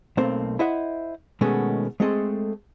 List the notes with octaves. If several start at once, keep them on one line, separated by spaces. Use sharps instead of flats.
B1 A3 A#3 C4 C5
E4 C5 D#5 E5 F#5
B2 D#3 G#3 A3 B3 C#4
G#3 A3 C4 G#4 A4 D#5